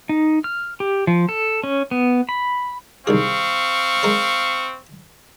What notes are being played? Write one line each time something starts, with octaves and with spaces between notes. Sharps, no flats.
D#4
F6
G4
F3
A4
C#4
B3
B5
C2 D#3 C4 G#4 F5 C#6
G#3 A#4 C5